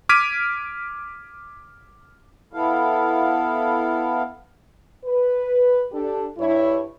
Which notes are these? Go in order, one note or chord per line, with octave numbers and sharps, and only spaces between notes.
D6 F6 G#6 B6 D7 D#7
B3 E4 A4 F5
B4
D4 G4 A4
G2 E4 C#5